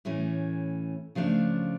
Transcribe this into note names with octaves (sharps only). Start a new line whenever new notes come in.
A2 E3 A3 C#4
C#3 F3 A3 D4